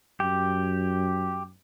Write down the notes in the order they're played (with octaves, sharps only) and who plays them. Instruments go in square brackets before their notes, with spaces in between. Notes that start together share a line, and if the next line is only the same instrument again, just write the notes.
[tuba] F#2 [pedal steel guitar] G4